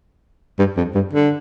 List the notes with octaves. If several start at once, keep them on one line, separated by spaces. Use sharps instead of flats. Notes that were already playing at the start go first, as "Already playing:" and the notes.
G2
F2
G2
D3